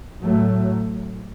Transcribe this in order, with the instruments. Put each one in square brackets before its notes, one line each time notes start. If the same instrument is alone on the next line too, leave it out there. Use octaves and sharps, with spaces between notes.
[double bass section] A2 F#3 A3